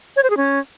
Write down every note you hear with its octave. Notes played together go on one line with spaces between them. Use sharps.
C#5
C5
G#4
C#4